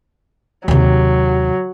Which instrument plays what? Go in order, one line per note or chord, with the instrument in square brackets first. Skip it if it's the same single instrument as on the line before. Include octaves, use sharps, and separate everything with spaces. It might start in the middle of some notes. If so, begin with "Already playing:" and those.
[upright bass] D#2 C3 [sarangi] F#3